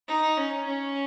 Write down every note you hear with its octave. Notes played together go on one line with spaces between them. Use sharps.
D#4
C#4
C#4